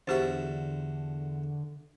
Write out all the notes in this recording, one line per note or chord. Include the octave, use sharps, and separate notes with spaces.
E2 D3 F#4 G4 C5 E5